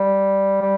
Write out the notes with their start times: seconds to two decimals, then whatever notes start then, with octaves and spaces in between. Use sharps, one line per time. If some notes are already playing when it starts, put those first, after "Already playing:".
Already playing: G3
0.62 G3